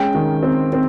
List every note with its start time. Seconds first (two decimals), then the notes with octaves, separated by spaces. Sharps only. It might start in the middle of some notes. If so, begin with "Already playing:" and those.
Already playing: G#3 C#4 G5
0.15 D#3
0.43 C4
0.73 C4